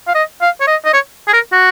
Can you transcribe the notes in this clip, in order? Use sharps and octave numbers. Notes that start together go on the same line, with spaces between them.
F5
D#5
F5
C#5
D#5
D#5
C#5
G#4
A#4
F#4